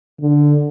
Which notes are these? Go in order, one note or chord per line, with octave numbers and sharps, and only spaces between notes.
D3